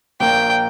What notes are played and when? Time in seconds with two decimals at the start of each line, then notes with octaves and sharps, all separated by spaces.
0.20 A#1 A#2 A#3 G5